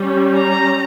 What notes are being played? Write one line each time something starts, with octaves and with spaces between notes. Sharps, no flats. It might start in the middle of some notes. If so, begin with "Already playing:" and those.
Already playing: G3 C#4
A#5